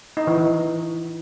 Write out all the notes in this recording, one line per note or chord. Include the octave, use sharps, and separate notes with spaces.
D#4
E3
E3